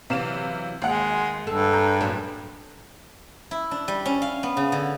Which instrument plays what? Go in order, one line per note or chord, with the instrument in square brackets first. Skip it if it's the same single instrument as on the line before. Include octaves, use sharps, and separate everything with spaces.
[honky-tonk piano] C3 F5 E7 [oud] E3 F#3
[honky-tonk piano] G#1 F#5 [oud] D#2 [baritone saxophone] G#3
[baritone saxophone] G2 [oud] A4
[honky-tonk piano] A#5 G6
[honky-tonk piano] F#1 [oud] A2 F#3
[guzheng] E4
D4
G3
C#4
F5
B3
C#3
D3